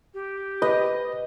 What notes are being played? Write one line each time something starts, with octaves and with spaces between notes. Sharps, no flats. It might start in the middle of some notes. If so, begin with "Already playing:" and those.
G4
B4 D#5